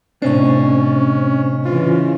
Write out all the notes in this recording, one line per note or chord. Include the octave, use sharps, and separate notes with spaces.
A2 C3 C#4 D4 C5 D#5 C#6
C#3 E3 F4